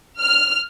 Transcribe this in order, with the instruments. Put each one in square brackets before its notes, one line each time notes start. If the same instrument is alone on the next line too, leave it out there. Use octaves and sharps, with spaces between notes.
[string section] F6